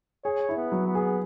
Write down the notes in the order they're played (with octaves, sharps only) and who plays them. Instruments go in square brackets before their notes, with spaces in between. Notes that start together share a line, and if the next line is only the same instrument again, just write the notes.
[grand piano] G#4 [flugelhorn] C#5
[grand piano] E4
[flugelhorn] B3
[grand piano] F#3
[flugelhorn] B3
[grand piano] G#4